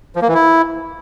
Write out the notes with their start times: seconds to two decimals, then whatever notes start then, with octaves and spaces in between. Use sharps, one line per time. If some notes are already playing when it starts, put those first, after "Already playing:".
0.16 F3
0.22 A#3
0.28 E3
0.34 E4